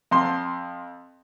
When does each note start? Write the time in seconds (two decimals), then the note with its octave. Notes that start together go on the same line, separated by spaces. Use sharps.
0.11 F2 C6